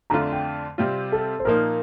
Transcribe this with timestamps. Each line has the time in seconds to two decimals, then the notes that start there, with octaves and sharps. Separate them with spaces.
0.10 F2 D3 A3 D4 F4 A#5
0.33 G5
0.78 C3 G3 C4 F4
1.12 A4
1.39 C5
1.45 A#2 F3 A#3 D#4 A#4